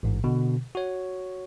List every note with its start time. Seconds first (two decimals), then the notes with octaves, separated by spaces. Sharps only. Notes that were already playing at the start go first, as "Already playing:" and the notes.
0.03 A1 G#2
0.24 B2 D3
0.75 F#4 C#5